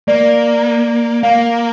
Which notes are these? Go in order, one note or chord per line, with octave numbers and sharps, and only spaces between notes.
A#3 D5
A#3 F5